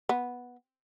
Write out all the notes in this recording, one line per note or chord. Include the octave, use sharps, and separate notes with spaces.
B3